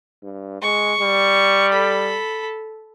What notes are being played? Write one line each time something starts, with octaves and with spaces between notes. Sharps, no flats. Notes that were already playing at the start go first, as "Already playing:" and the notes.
G2
G#3 C#6
G3
A4 B5